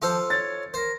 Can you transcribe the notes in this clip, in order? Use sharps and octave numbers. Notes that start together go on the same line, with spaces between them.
F3 F4 A4 C5
C#5 A6
A#4 C5